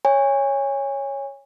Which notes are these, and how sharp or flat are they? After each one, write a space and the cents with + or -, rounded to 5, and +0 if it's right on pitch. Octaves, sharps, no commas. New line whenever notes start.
C#5 +0 G#5 -25